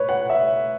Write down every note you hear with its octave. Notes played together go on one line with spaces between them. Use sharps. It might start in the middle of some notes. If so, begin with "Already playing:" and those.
Already playing: B4 C#5
F#5
E5